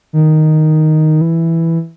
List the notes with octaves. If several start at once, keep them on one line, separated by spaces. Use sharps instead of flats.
D#3
E3